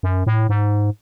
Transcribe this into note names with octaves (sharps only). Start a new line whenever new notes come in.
F#2
A2
G#2